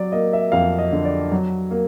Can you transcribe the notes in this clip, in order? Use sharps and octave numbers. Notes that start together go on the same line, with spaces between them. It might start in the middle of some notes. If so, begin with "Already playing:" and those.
Already playing: F#3 D5
A#3 D#5
E5
F2 F5
D#5
D3
D5
F#3
A#3